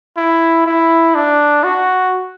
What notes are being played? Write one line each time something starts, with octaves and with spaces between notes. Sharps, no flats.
E4
E4
D4
F#4